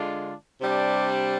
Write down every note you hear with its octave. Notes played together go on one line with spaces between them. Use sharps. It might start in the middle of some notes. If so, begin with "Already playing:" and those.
Already playing: D3 G#3 D4 F4
C3 G3 D4